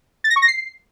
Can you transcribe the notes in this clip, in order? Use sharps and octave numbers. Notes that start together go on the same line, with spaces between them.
A6
A#6
C#6
A#6
C7